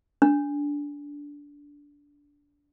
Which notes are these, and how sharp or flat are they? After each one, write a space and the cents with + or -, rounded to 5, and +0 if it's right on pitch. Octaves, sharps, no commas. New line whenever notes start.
D4 -20